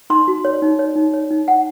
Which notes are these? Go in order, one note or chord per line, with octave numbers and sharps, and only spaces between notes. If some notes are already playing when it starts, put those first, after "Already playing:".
D#4 C6
F#4
C#5
D#4
C#5
D#4
C#5
D#4
D#4 F#5